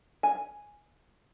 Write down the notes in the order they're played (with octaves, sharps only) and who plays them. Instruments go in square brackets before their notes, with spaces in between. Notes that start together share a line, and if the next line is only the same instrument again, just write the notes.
[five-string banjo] G#5